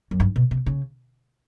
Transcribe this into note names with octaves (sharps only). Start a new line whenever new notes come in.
F#2
G2
B2
C3
C#3